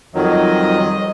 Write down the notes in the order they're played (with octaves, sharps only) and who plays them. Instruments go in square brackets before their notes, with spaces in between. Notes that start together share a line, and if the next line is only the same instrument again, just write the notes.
[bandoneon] F2 D#3 F#3 [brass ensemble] G3 C5 D#5